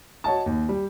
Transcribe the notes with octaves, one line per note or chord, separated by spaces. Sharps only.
F#4 C#5 D#5 A5
D#2
G3